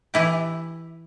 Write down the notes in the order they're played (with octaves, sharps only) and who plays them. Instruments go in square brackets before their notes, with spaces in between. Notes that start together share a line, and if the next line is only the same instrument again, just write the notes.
[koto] E3 E4 G4